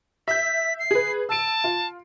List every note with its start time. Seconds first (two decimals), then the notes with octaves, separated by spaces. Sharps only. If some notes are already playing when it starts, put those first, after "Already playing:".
0.28 E5 G6 B6
0.79 C7
0.91 G#4 B4
1.29 A5 E6 D7
1.64 F4